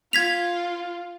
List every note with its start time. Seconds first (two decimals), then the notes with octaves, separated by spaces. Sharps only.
0.13 F4 G#6 B6 F7